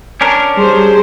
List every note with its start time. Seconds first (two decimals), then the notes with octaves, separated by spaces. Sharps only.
0.21 C#4 D4 A#4
0.58 G3 G#4 C5